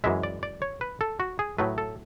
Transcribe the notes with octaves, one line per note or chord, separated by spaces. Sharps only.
F#2 E3 G#3 E5
D5
D5
C#5
B4
A4
F#4
G#4
A2 F#3 A3 B4
A4